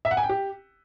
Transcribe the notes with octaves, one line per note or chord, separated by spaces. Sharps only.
E5
F#5
G#5
G5
G4